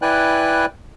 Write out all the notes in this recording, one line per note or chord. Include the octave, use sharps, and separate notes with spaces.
E4 B4 D5 G5 G#5 F#6